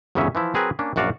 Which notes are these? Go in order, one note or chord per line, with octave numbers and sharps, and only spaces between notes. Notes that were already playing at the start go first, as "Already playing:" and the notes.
G1 E2 C#3 F#3 C#4 E5
E3 F3 E4
F#3 C4 G#4 A#4 B4
A#3 C#4 D4
A#1 F#2 F#4 D5 F5